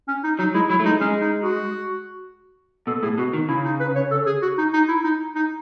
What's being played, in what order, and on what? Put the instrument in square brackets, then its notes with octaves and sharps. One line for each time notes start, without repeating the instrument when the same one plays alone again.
[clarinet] C#4
D#4
[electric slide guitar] F#3 [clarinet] D#4
[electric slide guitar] G#3 [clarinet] E4
[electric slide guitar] F#3 [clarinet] E4
[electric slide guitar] A3
[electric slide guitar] G#3 [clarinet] D#4
[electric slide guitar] G#3 [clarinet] C#4
[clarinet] D#4
F#4
[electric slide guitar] B2 [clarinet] A4
[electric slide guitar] A2 [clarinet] G#4
[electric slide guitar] B2 [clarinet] F#4
[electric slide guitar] D#3
[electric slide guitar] C#3 [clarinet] E4
[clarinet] D#4
B4
C#5
A4
G#4
F#4
D#4
D#4
E4
D#4
D#4